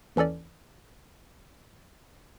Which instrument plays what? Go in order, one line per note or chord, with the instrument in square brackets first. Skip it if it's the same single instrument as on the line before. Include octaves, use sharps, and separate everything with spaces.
[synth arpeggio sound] D#2 E3 C#4 A4 D5